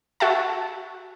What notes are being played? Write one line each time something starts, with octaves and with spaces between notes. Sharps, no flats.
F#4 E5 A5